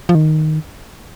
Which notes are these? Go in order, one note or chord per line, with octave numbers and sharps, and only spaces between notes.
F3
D#3